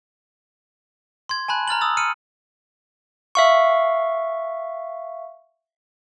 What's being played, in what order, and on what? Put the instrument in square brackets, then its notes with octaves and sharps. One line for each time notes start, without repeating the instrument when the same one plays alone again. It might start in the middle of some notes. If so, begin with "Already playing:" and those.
[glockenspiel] C6 G#6
G#5 A5 B5 F#6
A#5 F6 A6 F#7
D#6 E6 A6
F6 C#7 D#7
[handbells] E5 F5 C#6